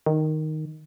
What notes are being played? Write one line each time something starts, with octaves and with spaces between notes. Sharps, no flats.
D#3